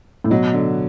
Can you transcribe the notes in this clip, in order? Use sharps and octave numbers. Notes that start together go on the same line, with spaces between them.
A2
B2 F#3
D3